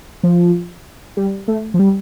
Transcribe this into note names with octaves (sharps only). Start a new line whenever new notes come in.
F3
G3
A3
F3
G3